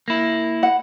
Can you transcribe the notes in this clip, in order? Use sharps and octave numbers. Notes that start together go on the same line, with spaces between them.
A#3 E4
F#5